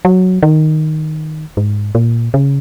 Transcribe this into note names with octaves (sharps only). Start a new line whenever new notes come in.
F#3
D#3
G#2
A#2
C#3